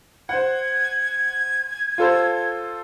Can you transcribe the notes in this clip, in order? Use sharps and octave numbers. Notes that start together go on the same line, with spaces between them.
C5 F#5 G#6
F4 A4 C5